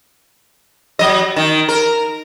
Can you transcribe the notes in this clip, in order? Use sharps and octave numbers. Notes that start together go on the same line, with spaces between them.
F#3 D#5
D#3
A#4